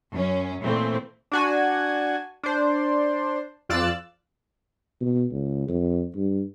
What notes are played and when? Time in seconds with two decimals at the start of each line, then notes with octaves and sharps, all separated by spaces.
0.11 F#2 C#4
0.62 A#2 E3 A3 C4
1.32 D4 F#4 G#5
2.43 D4 C5
3.69 F2 F4 D5 E6 F#6 A6
5.01 B2
5.32 C#2
5.68 F2
6.16 G2